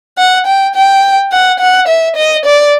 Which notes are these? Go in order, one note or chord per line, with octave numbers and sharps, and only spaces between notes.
F#5
G5
G5
F#5
F#5
E5
D#5
D5